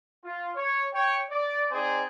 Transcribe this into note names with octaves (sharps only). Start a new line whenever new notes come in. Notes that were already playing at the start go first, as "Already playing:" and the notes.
F4
C#5
C#5 G5
D5
C4 D#4 G#4 C5 D5 G#5